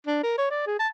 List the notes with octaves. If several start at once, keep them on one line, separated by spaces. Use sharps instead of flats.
D4
A#4
C#5
D5
G#4
A5